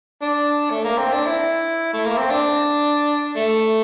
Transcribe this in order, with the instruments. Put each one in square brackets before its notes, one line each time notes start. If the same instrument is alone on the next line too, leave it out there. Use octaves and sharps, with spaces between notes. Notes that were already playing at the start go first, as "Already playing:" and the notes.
[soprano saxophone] D4
A3
A#3
C4
D4
E4
A3
A#3
C4
D4
A3